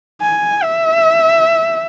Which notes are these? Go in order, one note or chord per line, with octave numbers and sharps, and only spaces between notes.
G#5
E5